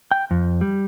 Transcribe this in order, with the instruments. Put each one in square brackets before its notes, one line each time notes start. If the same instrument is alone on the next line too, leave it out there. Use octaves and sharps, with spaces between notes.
[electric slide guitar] G5
F2
G3